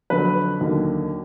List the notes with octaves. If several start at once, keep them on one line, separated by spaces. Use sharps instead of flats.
F2 D3 F#3 B4
D#2 D3 F#3 A#3